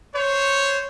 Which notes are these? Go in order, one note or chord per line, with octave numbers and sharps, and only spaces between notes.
C5 C#5